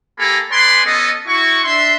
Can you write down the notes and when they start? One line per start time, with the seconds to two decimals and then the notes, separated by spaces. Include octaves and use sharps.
0.18 A#3 G4 A4 G#5 A#5 B5
0.51 G#3 B4 D5 G#5 B5 C6
0.85 B3 C#4 A4 D#5
1.26 E4 F#4 C#6
1.64 D4 E5 C6